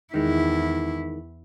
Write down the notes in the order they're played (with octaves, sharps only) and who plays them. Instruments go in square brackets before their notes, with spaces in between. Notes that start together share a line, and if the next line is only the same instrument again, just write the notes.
[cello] E2 E4 [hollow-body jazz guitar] D#3 G#3